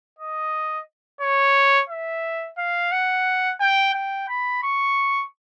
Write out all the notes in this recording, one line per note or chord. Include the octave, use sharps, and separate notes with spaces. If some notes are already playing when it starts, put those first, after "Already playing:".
D#5
C#5
E5
F5
F#5
G5
G5
B5
C#6